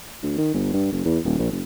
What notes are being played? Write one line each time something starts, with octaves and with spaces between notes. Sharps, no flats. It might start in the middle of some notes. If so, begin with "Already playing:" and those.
D2
D#3
G1
G2
F#1
E2
D#1
A#1
F#1